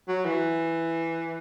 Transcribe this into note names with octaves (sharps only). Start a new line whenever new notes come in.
F#3
E3